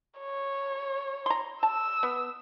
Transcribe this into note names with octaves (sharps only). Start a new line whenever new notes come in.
C#5
A#5 C6
A5 E6
B3